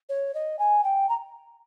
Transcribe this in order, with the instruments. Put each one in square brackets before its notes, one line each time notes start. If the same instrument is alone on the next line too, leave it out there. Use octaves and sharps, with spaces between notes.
[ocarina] C#5
D#5
G#5
G5
A#5